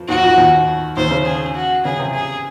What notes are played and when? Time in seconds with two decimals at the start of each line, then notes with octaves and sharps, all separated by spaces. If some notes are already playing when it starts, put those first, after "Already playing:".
Already playing: F2 F3
0.08 D#2 D#3 F#4
0.23 F2 F3
0.37 D#2 D#3
0.96 D#2 D#3 C5
1.11 C#3
1.26 G#4
1.55 F#4
1.85 C#3 G#4
1.99 C3
2.14 G#4